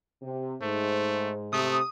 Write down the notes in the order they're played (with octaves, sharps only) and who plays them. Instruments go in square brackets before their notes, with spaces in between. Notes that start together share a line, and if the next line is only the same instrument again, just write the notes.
[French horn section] C3
[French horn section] G#2 [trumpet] A3 [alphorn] C5
[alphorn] C3 [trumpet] A3 [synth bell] D#6